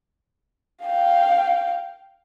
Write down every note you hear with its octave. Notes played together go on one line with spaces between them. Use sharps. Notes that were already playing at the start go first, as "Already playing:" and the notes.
F5 G5